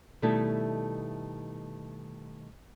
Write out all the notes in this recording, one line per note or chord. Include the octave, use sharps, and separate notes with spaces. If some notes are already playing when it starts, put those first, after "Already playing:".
B2 D#3 G3 A3 E4 A4